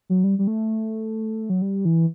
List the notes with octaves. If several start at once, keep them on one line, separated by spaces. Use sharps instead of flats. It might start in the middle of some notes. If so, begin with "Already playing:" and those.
F#3
G3
G3
A3
F#3
G3
E3